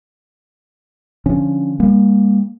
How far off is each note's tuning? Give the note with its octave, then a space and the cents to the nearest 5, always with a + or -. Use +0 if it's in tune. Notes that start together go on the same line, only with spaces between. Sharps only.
D3 +0 F3 +0 C#4 +0
G3 +45 A#3 +15